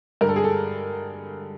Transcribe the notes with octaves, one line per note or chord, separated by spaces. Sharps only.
G2 D3 A#4
A4
G#4
A4